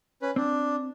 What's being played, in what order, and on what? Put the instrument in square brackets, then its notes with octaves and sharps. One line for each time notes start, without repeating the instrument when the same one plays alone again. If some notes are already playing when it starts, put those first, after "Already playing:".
[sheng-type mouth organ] C#4 B4
[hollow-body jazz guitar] C4 [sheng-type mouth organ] D4